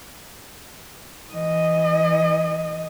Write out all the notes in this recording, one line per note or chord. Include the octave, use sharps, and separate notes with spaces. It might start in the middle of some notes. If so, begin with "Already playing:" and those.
E3 D#5